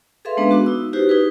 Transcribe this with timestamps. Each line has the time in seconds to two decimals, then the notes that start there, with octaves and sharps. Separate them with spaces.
0.25 G#4 A4 B4 E5 F5 C6
0.37 G#3 A#3 B3 C#4 D4 B4
0.50 B3 F#4 D6
0.66 D#4 E6
0.93 D#4 E4 F#4 G4 B4 C5
1.09 D#4 G#4 B4